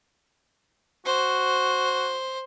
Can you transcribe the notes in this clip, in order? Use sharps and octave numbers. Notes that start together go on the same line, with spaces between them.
F#4 C5